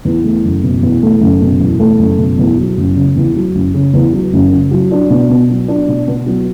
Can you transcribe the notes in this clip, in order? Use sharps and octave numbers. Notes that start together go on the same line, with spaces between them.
E2
A3
F#1
B2
E2
A3
F#1
B2
E2
A3
F#1
B2
E2
F#3
F#1
C#3
E2
F#3
F#1
C#3
E2
F#3
F#1
C#3
F#3
D4
B2
B3
F#3
D4
B2
B3
F#3